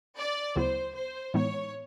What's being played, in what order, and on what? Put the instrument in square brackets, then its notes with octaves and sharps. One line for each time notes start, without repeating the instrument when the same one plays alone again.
[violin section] D5
[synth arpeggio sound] D2 C#3 F#3 B3 E4 [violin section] C5
[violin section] C5
[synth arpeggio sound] A2 E3 G#3 B3 D#4 [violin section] C#5